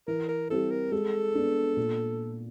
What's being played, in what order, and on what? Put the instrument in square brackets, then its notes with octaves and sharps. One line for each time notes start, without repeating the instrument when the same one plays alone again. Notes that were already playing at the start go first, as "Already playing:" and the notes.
[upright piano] E3 [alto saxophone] A#4
[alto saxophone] A#4
[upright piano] G3 C4 E4 [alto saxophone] A4
[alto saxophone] A#4
[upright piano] G#3 [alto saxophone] A4
[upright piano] B3 D4
A#2